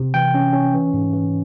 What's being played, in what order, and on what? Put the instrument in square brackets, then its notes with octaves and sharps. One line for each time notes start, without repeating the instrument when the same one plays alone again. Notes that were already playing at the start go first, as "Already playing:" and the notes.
Already playing: [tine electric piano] C3
E3 G5
C#4
C#4
E3
G#2
E3